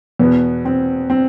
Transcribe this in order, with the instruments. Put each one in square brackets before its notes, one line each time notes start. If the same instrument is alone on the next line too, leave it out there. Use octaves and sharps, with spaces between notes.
[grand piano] E2 B2 B3
C4
C4